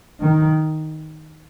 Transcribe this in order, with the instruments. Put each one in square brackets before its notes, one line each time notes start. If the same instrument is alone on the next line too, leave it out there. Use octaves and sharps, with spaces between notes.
[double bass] D#3